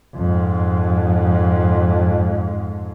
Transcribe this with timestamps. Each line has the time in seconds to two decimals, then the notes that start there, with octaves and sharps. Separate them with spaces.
0.16 F2 G#2